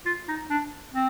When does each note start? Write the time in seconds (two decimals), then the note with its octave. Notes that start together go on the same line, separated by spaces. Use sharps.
0.06 F4
0.28 D#4
0.50 D4
0.94 C4